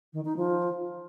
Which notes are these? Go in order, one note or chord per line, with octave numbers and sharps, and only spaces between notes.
D#3
D#4
F3